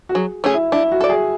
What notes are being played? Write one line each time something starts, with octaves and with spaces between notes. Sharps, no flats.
F#4
F#3 G#4
A3 C#4 G#4
E4
D4 E4
F#4
A4 D5
G#4